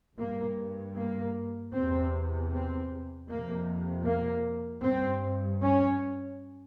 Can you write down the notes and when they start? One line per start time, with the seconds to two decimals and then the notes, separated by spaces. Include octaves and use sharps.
0.18 G2 A#3
0.96 A#3
1.73 E2 C3 C4
2.51 C4
3.27 F2 C3 A#3
4.05 A#3
4.82 G2 C4
5.60 C#4